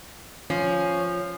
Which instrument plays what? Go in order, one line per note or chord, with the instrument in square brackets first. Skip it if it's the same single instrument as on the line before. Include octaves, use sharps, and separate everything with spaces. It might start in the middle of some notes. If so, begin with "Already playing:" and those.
[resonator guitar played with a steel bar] F3 [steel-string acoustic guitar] C#4